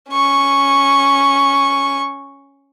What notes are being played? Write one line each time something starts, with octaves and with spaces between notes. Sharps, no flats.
C#4 C#6